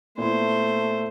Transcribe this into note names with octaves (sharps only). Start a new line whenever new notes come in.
A#2 A3 B3 E4 C5